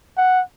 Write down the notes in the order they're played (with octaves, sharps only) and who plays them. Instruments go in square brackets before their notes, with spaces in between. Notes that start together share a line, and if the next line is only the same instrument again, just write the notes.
[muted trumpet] F#5